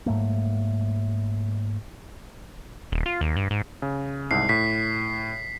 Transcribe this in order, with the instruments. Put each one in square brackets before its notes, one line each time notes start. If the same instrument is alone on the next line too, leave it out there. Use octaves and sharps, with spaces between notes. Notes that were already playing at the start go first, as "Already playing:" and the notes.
[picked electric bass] G#2 F#3 A3 A#3
[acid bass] D#1
F4
D#2
G2
G#2
[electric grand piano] C#3
[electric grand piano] C2 G#2 [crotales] C7
[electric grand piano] A2 [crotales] B6